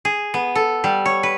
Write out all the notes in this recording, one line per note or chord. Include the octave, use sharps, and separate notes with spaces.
G#4
B3
A4
G3
C#5
B4